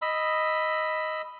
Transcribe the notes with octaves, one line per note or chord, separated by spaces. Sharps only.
D#5 B5 E6